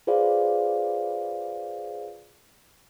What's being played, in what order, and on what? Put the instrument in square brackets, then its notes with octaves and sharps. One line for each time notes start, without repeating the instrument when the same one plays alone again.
[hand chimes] F4 G#4 B4 C5 D5 F5